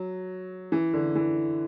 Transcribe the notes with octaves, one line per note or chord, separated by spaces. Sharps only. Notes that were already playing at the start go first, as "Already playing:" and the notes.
Already playing: F#3
E3
D3
E3